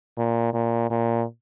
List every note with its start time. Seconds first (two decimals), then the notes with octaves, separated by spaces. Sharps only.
0.17 A#2
0.53 A#2
0.90 A#2